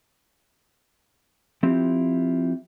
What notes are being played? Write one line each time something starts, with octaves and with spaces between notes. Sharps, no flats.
F3 C4 E4 F4 G4